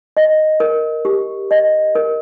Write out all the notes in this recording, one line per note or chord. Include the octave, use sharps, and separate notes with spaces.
D#5
A#4
G4
D#5
A#4